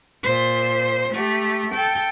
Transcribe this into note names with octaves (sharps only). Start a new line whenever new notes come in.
A#2 C5
A3 G4
A4 G5